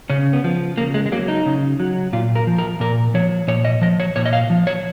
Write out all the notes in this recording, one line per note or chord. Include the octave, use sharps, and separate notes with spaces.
C#3 C#4
B3
F3
C#3 A#3
G#3
G#3
F#3 A#3
D#4
C#3
F#3
A#2 F4
A#4
F3
A#4
A#2 A#4
F3 C#5
A#2 C#5
D#5
F3 D#5
C#5
A#2 C#5
D#5
F5
F3
C#5